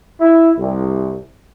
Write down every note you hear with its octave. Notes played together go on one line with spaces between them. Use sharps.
E4
C2